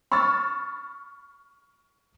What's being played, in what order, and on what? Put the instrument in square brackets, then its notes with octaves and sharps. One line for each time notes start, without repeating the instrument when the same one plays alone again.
[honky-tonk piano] B5 C#6 E6 F6 A6